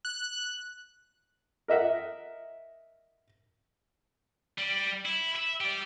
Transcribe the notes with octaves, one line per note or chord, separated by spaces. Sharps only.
F#6
A#4 D#5 E5 F#5
G3
E4
E5
G4 D5